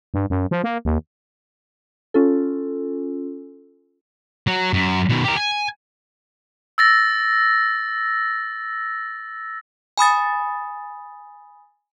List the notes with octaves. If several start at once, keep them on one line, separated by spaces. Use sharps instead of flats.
G2
F#2
F3
A#3
D#2
C#4 F4 A4
F#3
F#2
B2 D#3
G4 A#4
G#5
E6 A6 A#6
G#5 B5 D#6 A6